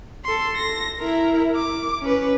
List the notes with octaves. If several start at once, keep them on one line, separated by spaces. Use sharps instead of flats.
A4 C6
A#6
E4 A#4
D6
C#4 B4